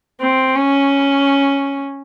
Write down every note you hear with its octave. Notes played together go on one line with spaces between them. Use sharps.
C4
C#4